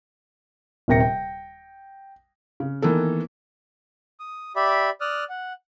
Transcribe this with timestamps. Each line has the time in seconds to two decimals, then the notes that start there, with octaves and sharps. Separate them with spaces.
0.88 D#1 C3 A#4 G5 A#6 C#7
1.00 G5
2.60 C#3
2.82 D#3 E3 A#3 B3 A4
4.20 D#6
4.56 G4 D5 E5 B5
5.01 D5 D#6 F6 F#6
5.29 F#5